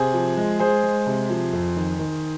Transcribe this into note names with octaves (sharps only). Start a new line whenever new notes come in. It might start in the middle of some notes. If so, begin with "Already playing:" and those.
Already playing: C3 G#4 C5
F3
G#3
G#3 G#4 C5
G#3
C3
F3
F2
D#3
D#3